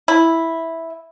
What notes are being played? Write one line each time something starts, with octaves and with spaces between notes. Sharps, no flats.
E4